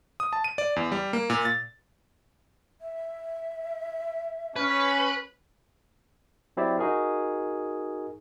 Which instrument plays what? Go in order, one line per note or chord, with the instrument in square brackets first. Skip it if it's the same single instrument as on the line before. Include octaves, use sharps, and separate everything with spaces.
[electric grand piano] D#6
A5
D#7
D5
E2
G3
A#3
A#2
A6
[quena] E5
[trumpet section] C#4 [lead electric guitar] B4
[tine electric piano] F#3 C4 E4 G4 D5 E5
D#4 F#4 G#4 A#4